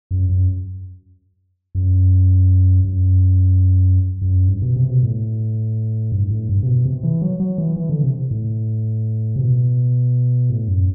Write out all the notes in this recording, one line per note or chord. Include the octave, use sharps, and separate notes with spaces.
F#2
F#2
F#2
F#2
F#2
G2
B2
C3
B2
A2
G2
A2
G2
C3
B2
C3
E3
F#3
F#3
E3
E3
D3
C3
A2
C3
B2
A2
F#2